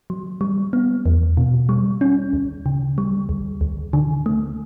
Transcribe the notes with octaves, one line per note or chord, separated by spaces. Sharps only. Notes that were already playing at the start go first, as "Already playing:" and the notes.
F#3
G3
B3
E2
B2
G3
C#4
D2
C#3
G3
D2
D2
D3
A3